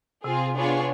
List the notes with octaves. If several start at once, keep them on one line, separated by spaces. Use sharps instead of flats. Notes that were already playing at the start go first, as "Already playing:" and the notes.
C3 C4 F4 G#4
B3 D4 F4 G#4 C#5